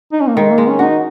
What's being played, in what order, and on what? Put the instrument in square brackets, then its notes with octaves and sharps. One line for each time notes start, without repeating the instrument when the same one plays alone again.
[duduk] D#4
C#4
A#3
[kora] D#3 [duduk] G#3
[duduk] A#3
[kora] G#3
[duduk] C#4
[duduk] D#4 [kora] F#4